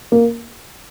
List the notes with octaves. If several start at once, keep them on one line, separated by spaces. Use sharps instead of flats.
A#3